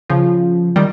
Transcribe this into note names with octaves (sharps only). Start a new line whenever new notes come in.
C#3 F3
D#3 G3